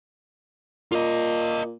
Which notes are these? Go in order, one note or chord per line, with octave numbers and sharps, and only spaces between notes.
A#2 F4 D#5